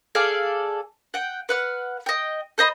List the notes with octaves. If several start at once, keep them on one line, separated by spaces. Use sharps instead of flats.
G#4 A4 D5 F5
F#5 G5
B4 F#5 F6
D#5 G5
A4 C5 D#5 B5